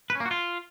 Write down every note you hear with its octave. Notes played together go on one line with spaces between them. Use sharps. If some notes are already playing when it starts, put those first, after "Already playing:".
B4
C#4
A#3
F#4
F4